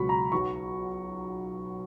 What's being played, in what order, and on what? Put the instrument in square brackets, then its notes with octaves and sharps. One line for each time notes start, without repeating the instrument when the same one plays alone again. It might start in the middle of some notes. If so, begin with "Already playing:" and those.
Already playing: [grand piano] C#2 B2 F#3 B5 C#6
A#5
B1 B2 F#3 C#6